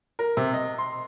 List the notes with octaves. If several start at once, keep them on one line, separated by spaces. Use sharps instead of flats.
A#4
C3
D#5
C6